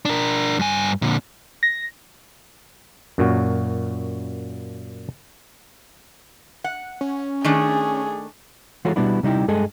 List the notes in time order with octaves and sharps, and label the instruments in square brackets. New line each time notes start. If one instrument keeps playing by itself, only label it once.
[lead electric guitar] D4 A#4
G2 G#5
A#2 D3
[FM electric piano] A#6
[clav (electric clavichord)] F#2 A#2 F#4
[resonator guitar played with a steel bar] F#5
[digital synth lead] C#4
[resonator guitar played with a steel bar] D#3 A3 D4 [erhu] G#4
[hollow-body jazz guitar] E3 G#3 F4 F#4 A4 C#5
B2 G3 B3 D4 E4
C3 G3 D#4 E4 G4
G2 G#3 G#4 A4 D#5 G#5